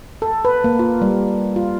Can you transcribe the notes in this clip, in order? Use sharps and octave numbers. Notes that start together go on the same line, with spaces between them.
A4
B4
A#3
F4
G3
F4